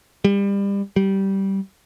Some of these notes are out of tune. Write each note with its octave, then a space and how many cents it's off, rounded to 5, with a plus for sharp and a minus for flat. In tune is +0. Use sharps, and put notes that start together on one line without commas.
G3 +30
G3 -15